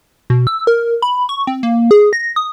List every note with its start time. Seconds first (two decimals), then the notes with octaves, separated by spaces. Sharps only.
0.30 B2
0.47 E6
0.67 A#4
1.02 B5
1.29 C#6
1.47 C4
1.63 A#3
1.91 G#4
2.13 A#6
2.36 D#6